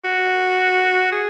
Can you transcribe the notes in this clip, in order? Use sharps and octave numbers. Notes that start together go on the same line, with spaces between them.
F#4
G#4